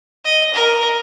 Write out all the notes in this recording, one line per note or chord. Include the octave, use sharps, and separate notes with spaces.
D#5
A#4